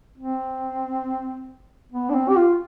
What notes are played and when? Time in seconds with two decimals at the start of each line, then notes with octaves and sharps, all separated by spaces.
0.18 C4
1.92 B3
2.09 D4
2.14 C4
2.28 G4
2.36 F4